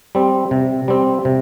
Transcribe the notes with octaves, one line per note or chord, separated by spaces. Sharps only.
G3 C4
C3
G3 C4
C3